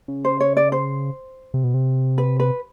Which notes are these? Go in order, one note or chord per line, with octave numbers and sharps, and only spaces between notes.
C#3
C5
C#5
D5
C5
C3
B2
C3
B4
B4